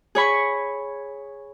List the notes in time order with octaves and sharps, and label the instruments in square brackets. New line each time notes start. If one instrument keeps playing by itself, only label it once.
[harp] G#4 C#5 B5 C#6